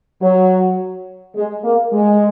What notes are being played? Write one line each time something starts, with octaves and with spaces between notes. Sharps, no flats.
F#3
G#3
A#3
G#3